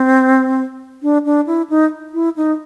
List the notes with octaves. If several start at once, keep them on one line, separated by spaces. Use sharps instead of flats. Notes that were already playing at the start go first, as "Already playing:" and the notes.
Already playing: C4
D4
D4
E4
D#4
E4
D#4